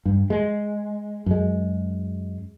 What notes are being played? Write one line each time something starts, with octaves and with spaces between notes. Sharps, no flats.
G2
G#3
F#2 G#3